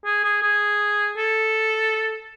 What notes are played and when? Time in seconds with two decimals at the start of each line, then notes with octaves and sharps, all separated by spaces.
0.05 G#4
0.24 G#4
0.43 G#4
1.17 A4